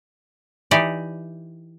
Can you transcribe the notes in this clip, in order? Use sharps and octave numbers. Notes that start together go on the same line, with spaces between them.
E3 D#4 G4 D5